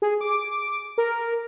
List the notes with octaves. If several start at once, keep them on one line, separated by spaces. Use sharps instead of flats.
G#4
D6
A#4